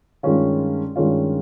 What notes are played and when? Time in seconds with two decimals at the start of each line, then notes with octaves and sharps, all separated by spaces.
0.23 G2 D#3 G#3 C#4 F4
0.96 G2 D#3 G#3 C#4 F4